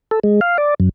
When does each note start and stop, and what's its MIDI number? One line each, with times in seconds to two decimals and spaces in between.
0.11 0.19 69
0.24 0.40 56
0.41 0.57 77
0.58 0.74 74
0.80 0.89 42